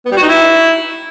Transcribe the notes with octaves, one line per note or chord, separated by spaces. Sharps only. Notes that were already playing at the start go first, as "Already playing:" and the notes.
B3
G3
F#4
D#4
E4